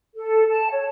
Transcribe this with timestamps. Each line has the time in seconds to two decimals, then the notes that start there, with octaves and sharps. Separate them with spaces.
0.14 A4
0.49 A5
0.70 C#5